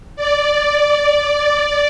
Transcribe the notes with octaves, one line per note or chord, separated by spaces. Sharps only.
D5